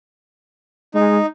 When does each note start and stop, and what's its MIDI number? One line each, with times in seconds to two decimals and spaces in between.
0.94 1.19 56
0.94 1.26 63